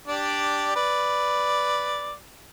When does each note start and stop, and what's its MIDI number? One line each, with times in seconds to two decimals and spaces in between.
0.08 0.71 62
0.08 0.71 67
0.08 0.71 74
0.76 2.15 71
0.76 2.15 74